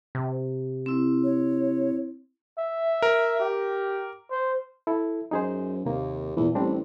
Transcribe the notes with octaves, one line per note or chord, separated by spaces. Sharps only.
C3
C4 E4
C#5
E5
A#4
G4
C5
E4 A4
F#2 D#4 G#4 C5
D#2 C3 A#3
E2 A#2 E3
A1 G3 C4 D4